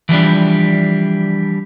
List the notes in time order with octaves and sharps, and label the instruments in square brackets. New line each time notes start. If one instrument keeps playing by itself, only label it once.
[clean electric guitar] E3 F3 G3 D4